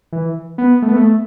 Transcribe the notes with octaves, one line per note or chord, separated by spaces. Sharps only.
E3
B3
A3
B3
A3